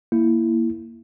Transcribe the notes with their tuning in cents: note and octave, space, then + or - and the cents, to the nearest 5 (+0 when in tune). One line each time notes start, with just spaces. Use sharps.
A#3 +0 E4 +5